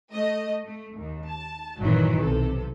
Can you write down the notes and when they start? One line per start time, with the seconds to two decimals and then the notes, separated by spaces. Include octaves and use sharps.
0.12 A3 D#5
0.63 A3
0.96 D#2
1.29 A5
1.79 G1 A#2 D#3 E3 F#3
2.21 B1 C3 A4